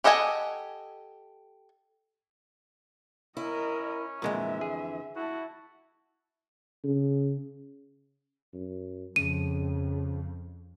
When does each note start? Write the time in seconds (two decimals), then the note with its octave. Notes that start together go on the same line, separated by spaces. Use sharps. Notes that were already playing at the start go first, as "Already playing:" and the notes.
0.04 G4 A4 D#5 F#5 G#5
3.37 C#4 E4 A#4 D#5
4.22 F2 A#2 D3 E3 G#3 E5
4.61 G#4
5.16 E4 F#4 A5
6.84 C#3
8.53 F#2
9.16 F2 C#3 D#7